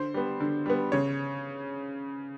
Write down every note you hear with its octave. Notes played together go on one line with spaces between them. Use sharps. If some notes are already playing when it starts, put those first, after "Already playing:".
Already playing: D3 C5
G3 B3
D3
G3 B3
C#3 C#5